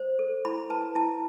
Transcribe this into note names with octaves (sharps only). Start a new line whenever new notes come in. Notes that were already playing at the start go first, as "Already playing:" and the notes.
Already playing: C5
A4
E4 B5
B4 A5
E4 A5